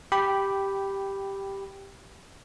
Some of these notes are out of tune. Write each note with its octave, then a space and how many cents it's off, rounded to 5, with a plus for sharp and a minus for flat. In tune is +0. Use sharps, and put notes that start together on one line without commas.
G4 +0 G5 -10 B5 +0